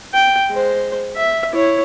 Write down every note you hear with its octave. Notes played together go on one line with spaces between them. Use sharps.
G5
G#3 C5
E5
E4 C#5